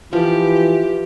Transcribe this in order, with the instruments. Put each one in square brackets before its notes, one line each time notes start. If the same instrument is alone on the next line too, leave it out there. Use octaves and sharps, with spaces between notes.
[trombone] E3 [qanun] F3 [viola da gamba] G4